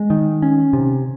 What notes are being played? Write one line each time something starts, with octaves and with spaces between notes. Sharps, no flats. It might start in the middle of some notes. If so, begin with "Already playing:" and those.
Already playing: G#3
D#3
C#4
C3